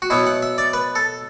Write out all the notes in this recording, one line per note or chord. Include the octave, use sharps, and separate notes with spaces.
F#4
B2 F#3 B3 E4
F#5
E5
D5
B4
A4